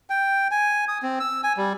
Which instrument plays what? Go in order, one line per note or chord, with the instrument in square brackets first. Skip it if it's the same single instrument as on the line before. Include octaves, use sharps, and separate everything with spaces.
[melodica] G5
G#5
D#6
C4
E6
G#5
G3